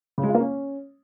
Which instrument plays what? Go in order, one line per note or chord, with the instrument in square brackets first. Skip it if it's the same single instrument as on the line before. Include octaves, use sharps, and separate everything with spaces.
[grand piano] C#3
G#3
F4
A#3
C#4